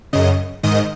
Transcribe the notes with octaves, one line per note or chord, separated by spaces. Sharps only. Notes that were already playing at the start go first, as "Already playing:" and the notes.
F#2 C#3 D#5
G#2 D#3 D#5